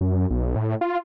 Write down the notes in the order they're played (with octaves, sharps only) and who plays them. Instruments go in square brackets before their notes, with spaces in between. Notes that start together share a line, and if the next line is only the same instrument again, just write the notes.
[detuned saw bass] F#2
B1
A2
F4